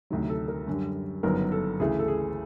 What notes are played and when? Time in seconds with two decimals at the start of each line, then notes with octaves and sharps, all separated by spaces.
0.10 D2 C3 D#3 F#3
0.29 A4
0.48 A#4
0.67 F#2 D3 G3
1.23 G1 F#2 D#3 F#3 B3 A#4
1.52 A4
1.80 D2 C#3 E3 A3 G#4
1.99 A4
2.08 G#4